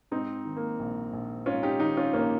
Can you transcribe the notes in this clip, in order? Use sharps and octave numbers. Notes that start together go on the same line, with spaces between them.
G#2 C4 D#4
D#3
A#3
A#1
A#1
G#2 C#4 F4
D#4 G4
D#3 D#4 G4
C#4 F4
A#1 A#3 C#4